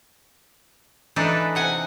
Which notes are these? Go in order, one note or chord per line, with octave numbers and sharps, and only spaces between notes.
E3 D4 D#4 A4 B4
C3 F#5 G#5